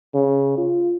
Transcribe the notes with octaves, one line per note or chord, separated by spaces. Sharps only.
C#3
F4